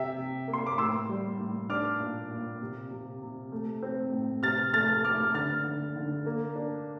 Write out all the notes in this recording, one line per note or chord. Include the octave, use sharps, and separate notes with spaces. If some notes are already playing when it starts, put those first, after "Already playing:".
Already playing: C3 E5 G5
C3
A#3
C6
D6
A2 C6 E6
G3
A2
D4 D6 F6
A#2
A#2
C3
C3
C3
A3
C4
A2
C3 F6 A6
A3 F6 A6
A3 D6 F6
D3 F6 A6
D3
D3
A#3
D4